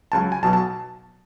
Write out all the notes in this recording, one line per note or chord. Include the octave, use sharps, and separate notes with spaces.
C#2 C#3 F#3 A5
G#5
B1 B2 F#3 A5
A5